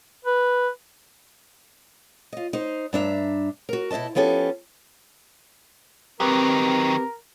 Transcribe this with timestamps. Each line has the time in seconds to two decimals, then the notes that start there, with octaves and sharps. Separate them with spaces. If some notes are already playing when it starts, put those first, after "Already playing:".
0.25 B4
2.33 F4 D#5
2.53 D#4 C5
2.93 G2 D4 E5 A#5
3.69 F#4 A#4
3.91 B2 E4 B4 D#5 A5
4.15 F3 B3 C#4 G4 A4
6.20 D#3 F#3 C4 G4 A#4 B4